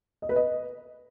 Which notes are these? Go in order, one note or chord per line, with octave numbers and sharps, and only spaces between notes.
D#5
B4
D#5